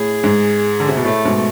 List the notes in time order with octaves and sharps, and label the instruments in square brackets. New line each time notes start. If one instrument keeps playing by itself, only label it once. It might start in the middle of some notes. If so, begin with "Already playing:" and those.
Already playing: [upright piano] A2 [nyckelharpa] G#4
[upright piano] G#2
D3
C3
B2
[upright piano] A2 [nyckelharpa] A3
[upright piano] G#2 B2